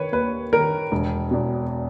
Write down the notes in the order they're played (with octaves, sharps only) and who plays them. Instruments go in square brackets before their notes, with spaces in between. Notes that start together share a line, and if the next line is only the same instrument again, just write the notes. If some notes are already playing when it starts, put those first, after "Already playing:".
Already playing: [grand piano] D#3 B4 C#5
D#2 B4
D#3 A#4
E1
E2 B2